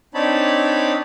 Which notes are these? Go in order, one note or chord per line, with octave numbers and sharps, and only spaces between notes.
C4 D4 D#4 C#5 A5 B5